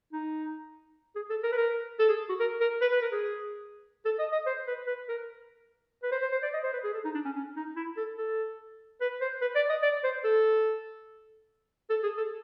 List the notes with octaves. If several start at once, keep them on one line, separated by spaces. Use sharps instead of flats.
D#4
G#4
A4
A#4
B4
A#4
A4
G#4
F#4
A#4
A#4
B4
B4
A#4
G#4
A4
D#5
D#5
C5
B4
B4
A#4
B4
C5
C5
C5
D5
D#5
C5
B4
G#4
A4
D#4
D4
C#4
C#4
D#4
E4
A4
A4
B4
C5
B4
D5
D#5
D5
C5
A4
A4
G#4
A4